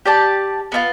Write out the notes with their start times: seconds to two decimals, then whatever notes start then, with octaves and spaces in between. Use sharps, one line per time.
0.06 G4 D5 A5
0.72 B3 D4 F4